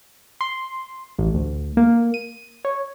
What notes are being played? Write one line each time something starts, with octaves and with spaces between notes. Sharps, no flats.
C6
A1
D2
A#3
D#7
C#5